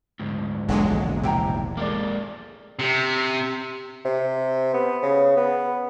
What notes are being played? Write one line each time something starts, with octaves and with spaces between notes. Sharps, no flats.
D2 G#2
E1 A#1 E2 D3 F#3 G#3
C3 E4 G5 A#5
G#3 A#3 D4 F4 D5
C3
C3
B3
C#3
B3